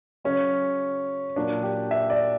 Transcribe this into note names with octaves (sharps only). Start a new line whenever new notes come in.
C#3 F#3 C#4
A#2 F#3 D4
G4
E5
D5